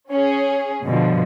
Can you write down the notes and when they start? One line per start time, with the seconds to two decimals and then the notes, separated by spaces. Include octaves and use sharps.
0.11 C#4 G#4
0.84 G2 B2 D3 F3